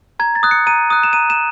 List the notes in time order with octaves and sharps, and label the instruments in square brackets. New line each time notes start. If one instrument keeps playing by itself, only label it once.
[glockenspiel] A#5 G#6
A6
D#6 F#6
C#7
A#5 D#7
D#6 F#6
E7
A#5 D#7
E7